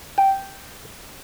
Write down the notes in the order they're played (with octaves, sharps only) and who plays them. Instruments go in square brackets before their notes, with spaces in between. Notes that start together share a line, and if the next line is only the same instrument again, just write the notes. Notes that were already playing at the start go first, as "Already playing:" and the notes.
[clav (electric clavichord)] G5